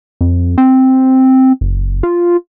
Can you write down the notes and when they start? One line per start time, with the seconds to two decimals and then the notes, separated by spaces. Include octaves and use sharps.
0.21 F2
0.58 C4
1.61 F#1
2.03 F4